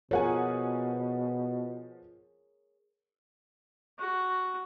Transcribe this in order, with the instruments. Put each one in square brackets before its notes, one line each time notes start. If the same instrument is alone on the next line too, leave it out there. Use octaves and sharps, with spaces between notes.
[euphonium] B2 [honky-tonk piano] F3 F#5 G#5 [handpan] G#4 A#4 C#5
[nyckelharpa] F#4